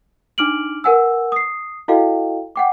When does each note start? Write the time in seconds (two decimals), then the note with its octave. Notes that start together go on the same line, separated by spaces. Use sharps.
0.38 D4 D#4 D6 F6 D7 F#7
0.84 A#4 B4 F#5 G#5 E6
1.32 D#6 C7
1.88 E4 F#4 A4 D#5 F5 G5
2.56 F#5 G5 D6